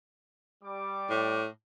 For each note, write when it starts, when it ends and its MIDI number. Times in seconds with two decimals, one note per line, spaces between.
0.63 1.42 55
0.63 1.42 86
1.10 1.47 45